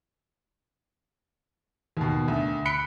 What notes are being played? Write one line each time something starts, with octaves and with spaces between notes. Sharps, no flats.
D#2 B2
D2
B5 F#6 B6 C#7 D7 G7